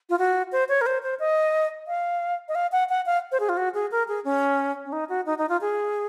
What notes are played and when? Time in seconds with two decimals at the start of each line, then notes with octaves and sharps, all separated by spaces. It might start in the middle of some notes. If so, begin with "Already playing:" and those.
0.10 F4
0.19 F#4
0.52 C5
0.69 C#5
0.81 A#4
0.86 C5
1.03 C5
1.19 D#5
1.88 F5
2.49 D#5
2.55 F5
2.72 F#5
2.89 F#5
3.06 F5
3.32 C5
3.40 G#4
3.49 F4
3.57 F#4
3.74 G#4
3.91 A#4
4.08 G#4
4.24 C#4
4.85 C#4
4.92 D#4
5.09 F#4
5.26 D#4
5.38 D#4
5.49 F4
5.61 G#4